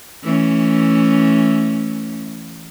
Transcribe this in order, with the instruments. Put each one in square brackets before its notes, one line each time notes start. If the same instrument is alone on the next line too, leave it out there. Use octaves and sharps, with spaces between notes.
[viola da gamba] E3 A3 C#4